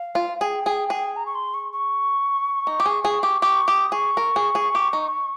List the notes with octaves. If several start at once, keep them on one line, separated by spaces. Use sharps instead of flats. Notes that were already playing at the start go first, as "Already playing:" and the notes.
Already playing: F5
F4
G#4 G5
G#4
G#4
A#5
C#6
C6
C#6
C#6
D#4
G4
G#4
G#4
G4
G4 C#6
G4 D#6
G#4 C#6
A#4
G#4
G#4
G4
D#4